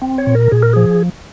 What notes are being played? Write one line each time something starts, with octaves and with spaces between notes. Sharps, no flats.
C4
C#5
A#2
A#4
A#2 G#4
A#4
F3 G#4